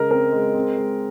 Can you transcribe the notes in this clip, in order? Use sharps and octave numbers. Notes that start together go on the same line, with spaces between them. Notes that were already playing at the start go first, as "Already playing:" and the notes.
Already playing: C#3 G#3 A#4 D#5
C4 A#4
G#3
C4
G#3